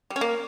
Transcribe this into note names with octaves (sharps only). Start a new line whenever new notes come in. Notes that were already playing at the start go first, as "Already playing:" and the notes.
G3
C#4
A#3